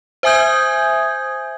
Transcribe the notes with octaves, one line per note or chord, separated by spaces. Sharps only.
C5 E5 G#5 D#6 G6 G#6